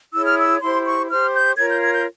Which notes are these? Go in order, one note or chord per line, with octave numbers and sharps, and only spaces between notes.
E4 G#4 C#5 E6
F6
E6
E4 G4 C5 C6
C#6
G4 C5 F6
G6
F4 A#4 C#5 G#6
G6
G#6
G6